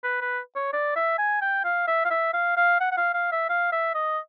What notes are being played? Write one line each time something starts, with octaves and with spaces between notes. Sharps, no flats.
B4
B4
C#5
D5
E5
G#5
G5
F5
E5
F5
E5
F5
F5
F#5
F#5
F5
F5
E5
F5
E5
D#5